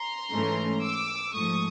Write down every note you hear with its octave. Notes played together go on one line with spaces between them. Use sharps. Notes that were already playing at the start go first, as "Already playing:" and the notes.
Already playing: A#5 C6
G#2 E3 A3 C#4
D6 E6
G#2 F3 A3 C#6 D#6